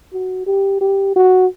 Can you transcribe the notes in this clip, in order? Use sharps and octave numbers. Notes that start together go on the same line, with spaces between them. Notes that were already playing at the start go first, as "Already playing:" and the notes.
F#4
G4
G4
F#4